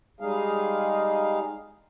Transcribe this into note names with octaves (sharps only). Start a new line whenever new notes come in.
G3 G#3 D#4 G#4 F5